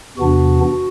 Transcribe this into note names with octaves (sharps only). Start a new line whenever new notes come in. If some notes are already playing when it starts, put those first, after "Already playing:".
E2 C3 E3 B3 D4 F#4